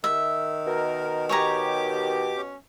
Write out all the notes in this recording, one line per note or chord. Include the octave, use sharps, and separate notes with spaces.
D#3 E5
B2 A#4
G4 C#5 G#5 A#5 D6
C#4